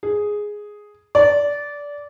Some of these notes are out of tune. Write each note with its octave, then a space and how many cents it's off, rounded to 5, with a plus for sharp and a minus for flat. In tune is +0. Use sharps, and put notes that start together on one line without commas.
G#4 +0
D5 -20